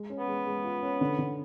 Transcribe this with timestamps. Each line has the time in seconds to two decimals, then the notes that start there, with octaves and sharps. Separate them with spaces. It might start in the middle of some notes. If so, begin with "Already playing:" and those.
Already playing: G#3
0.10 C#4
0.19 B3
0.28 G#3
0.46 G#3
0.64 F4
0.82 C#4
1.01 D3
1.18 D3